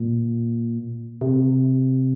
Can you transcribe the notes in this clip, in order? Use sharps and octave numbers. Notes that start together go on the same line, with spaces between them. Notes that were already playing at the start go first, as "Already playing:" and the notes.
Already playing: A#2
C3